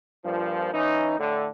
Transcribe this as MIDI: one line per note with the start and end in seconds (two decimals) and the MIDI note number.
0.24 0.72 43
0.24 0.72 46
0.24 0.72 53
0.73 1.15 52
0.73 1.15 61
0.73 1.15 63
1.19 1.46 45
1.19 1.46 50